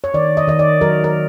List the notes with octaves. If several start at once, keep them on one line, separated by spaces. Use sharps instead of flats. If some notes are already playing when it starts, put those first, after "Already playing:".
C#5
D#3 D5
D#5
D#3 D#5
D5
F#3 A#4
A#4